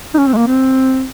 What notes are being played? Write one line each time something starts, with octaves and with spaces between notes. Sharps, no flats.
D#4
C#4
C4
G#3
A#3
C4